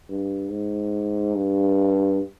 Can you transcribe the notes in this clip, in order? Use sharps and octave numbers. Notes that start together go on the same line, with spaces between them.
G2
G#2
G2